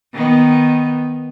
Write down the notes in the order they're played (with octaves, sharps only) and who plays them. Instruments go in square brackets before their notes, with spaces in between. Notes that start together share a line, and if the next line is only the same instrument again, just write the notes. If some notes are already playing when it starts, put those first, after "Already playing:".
[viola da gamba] D#3 B3